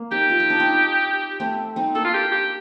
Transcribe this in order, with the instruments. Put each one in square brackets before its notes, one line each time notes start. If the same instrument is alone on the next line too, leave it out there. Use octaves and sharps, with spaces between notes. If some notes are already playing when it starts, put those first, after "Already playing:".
Already playing: [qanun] A#3
[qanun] C4 D#4 [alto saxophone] G4
[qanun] F4
D#4
D4
C4 D#4
A3 C4
C4 D#4
[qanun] A#3 D4 [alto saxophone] A4
[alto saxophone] F4
G4
G4